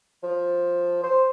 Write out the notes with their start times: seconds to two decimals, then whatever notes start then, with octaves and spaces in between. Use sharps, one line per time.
0.23 F3
1.04 C5